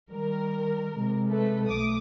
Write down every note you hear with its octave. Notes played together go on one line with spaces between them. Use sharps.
D#3 G3 A#4
C3 G#3
A3 A4 B4
B1 A3 D6 D#6